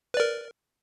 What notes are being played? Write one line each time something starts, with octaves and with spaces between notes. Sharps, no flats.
A#4 B4 D5